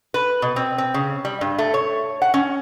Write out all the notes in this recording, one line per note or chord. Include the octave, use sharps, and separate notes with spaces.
B4
B2
C4
C4
C#3
G3
G2
A3
C#5
F#5
C#4